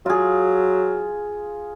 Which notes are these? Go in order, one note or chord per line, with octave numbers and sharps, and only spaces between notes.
F#3 F4 G#4